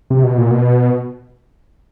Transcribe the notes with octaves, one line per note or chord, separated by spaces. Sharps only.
C3
B2
A#2
B2